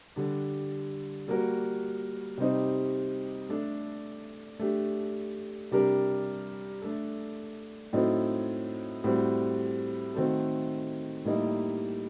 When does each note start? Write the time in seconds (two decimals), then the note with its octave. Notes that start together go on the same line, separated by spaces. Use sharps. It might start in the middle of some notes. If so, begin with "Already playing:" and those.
0.16 D3 G3 D4
1.28 G3 A#3 F#4 A#4
2.38 C3 G3 C4 D#4
3.49 A3 D4 A4
4.59 A3 D4 G4
5.71 C3 G3 D4 G4 A#4
6.82 A3 D4 A4
7.93 A2 F#3 C4 D#4 A4
9.04 A2 G3 C4 F#4
10.14 D#3 A3 C4 F#4 A4
11.25 A2 G3 A#3 D#4